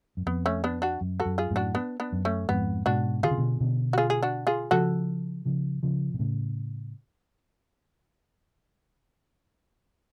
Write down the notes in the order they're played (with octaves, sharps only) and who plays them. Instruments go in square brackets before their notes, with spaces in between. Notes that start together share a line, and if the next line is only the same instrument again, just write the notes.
[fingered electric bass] F#2
[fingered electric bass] F2 [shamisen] B3
[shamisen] A3 C#4
B3 D4
D4 F#4
[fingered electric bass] F#2
[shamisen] F#4 A4
[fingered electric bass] F#2
[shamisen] F4 G#4
[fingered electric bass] F#2 A2
[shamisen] D4 F#4
B3 D4
B3 D4
[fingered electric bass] F#2
[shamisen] A3 C#4
[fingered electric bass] F2 G#2 [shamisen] B3
[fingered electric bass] G#2 B2 [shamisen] D4 F#4
[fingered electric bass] D3 [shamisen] F4 G#4
[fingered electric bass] C#3
B2 D3
B2 D3
[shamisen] F#4
F4 G#4
G#4
D4 F#4
F4 G#4
[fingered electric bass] C#3 F3 [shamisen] F#4 A4
[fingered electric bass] C#3 F3
C#3 F3
B2
A2 C#3